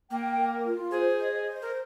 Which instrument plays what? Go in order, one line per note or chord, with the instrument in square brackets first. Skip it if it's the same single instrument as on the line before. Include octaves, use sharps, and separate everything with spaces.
[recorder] A#3 [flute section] G5
[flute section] A#4
F4
[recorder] G#4 [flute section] C5
[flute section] D#5
C5
[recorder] A#4